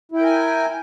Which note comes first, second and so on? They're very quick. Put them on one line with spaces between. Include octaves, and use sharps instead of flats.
E4 G5 A#4 G#5